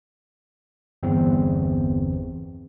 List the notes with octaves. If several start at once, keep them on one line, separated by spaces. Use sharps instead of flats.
G1 E2 C4